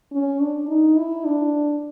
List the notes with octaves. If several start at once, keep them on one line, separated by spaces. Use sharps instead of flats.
C#4
D4
D#4
E4
D4